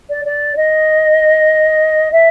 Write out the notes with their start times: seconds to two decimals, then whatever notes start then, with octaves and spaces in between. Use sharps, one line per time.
0.09 D5
0.25 D5
0.56 D#5
2.11 E5